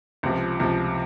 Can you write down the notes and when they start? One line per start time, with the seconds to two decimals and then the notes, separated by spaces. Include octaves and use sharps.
0.23 C#2 C3 F3
0.60 C#2 C3 F3